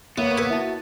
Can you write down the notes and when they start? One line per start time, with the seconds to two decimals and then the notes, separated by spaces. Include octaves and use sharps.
0.18 A#3 B3 E4 C#5 D#7
0.38 B4 F#5 E6 G#6 B6
0.50 E4 F#4 A5